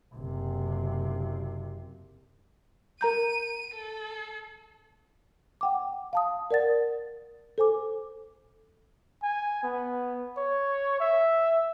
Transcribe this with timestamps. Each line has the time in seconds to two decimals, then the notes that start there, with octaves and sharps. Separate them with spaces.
0.15 F#1 C3
3.01 A#4 A#5 G6 D#7
3.75 A4
5.61 F#5 G5 D6
6.13 F5 A5 D#6
6.51 A#4 D5 F#5 A6
7.58 A4 C5 G#5 D6
9.23 G#5
9.63 B3
10.38 C#5
11.00 E5